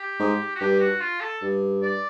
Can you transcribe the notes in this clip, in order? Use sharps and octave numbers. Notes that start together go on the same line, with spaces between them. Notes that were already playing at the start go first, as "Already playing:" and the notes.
Already playing: G4
G#2
F#4
G2 G4
F#4
F4
A4
G2
D5